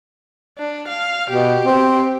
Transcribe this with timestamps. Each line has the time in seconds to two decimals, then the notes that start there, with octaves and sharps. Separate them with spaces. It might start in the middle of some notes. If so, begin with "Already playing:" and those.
0.58 D4
0.88 F5
1.30 B2 G4
1.65 C4